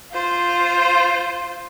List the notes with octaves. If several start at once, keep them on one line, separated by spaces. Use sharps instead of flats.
F4 C5